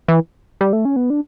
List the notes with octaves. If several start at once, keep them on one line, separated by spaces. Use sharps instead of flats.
E3
G3
A3
C#4
B3
D4